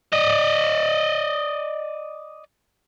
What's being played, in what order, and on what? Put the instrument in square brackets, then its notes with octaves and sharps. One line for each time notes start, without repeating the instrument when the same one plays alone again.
[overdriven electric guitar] D5 D#5